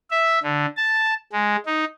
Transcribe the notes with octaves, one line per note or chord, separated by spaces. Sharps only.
E5
D3
A5
G#3
D#4